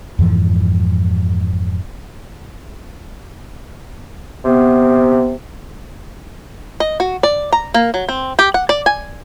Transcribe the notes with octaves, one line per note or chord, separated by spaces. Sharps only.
F2 G#2 E3 F3
C3 B3
D#5
F#4
D5
A#5
A#3
F#3
C4
G4
F#5
D5
G#5